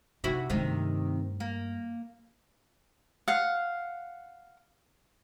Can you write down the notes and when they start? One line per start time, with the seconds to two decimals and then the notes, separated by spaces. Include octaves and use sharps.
0.24 C3 D#4 E4 F#4
0.50 G2 C3 D#3 A3
1.40 A#3
3.28 F5 F#5